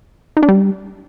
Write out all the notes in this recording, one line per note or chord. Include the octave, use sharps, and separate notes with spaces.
D#4
D4
G3